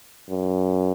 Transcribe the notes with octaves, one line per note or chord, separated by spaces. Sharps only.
F#2